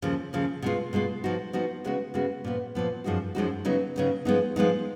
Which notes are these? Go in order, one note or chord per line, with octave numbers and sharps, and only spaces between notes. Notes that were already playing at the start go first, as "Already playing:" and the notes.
D#2 C#3 F3
D#2 C#3 F3
B2 G#3 B3 F4
B2 G#3 B3 F4
F3 B3 D#4 F#4
F3 B3 D#4 F#4
C#3 G#3 B3 F#4
C#3 G#3 B3 F#4
A#2 F3 B3
A#2 F3 B3
F#2 F3 G#3 D#4 F#4
F#2 F3 G#3 D#4 F#4
C#3 F#3 B3 D#4
C#3 F#3 B3 D#4
F3 G#3 B3 D#4
F3 G#3 B3 D#4